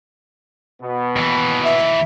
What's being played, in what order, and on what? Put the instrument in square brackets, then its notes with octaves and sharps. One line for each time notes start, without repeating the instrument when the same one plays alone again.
[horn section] B2 B3
[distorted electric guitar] D#2 E3
[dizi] E5